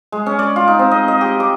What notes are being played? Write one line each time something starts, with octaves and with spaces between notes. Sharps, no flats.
G#3
C#4
D5
F4
D#4
C4
D#5
D#5
G4
D6